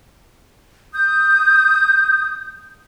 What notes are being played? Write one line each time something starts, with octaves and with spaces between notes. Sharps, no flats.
D#6 G6